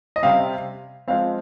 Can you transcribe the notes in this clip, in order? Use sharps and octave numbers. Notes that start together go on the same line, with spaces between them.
D#5
C3 G3 C4 F5
F3 G#3 C4 F5